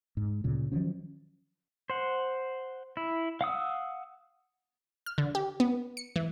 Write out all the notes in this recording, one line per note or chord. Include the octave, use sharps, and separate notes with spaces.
G#2
D2 A#2 C#3
D#3 F3 F#3 C#4
C5 F#5
E4
F5 F#5 D#6 E6
F6
D3
G4
B3
C#7
E3